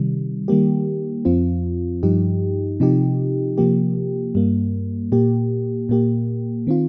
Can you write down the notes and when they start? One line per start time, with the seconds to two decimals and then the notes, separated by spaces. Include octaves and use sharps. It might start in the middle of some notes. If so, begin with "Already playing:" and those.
Already playing: C3 D#3 G3
0.48 D#3 G3 A#3 G4
1.25 F2 F3 C4 F4
2.03 G2 F3 D#4 G4
2.80 C3 F3 D#4 G4
3.58 C3 F3 A#3 G4
4.35 G2 G3 A#3
5.12 A#2 A#3 G4
5.89 A#2 A#3 G4
6.67 D#3 C4 F4